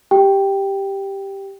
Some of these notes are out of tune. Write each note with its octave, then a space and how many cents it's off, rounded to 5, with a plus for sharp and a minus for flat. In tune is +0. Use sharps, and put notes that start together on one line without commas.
G4 +0 G5 +0